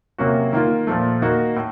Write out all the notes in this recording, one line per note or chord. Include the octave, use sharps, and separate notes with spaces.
C3 F#3 A#3 C#4 F#4
D#3 A#3 F4
A#2 F3 A3
D#3 A#3 D#4 F#4
A2